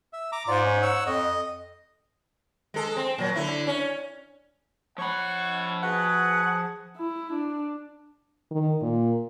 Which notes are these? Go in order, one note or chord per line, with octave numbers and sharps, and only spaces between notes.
E5
A#5 D6
G#2 F4 D5
C#4 D#4
C#5 F#5 E6
F2 D#5
G#3 A4
C4
A#2 F#3
D3 E4
C#4
F3 C#5 F#5 B5 C#6
F#4 G#4 B4 F#5
E4
D4
D#3
A#2